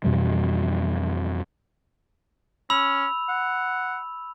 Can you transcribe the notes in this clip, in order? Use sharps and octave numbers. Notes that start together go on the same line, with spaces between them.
F2 B2 E3 G3
C#4 B5 E6 F7
F#5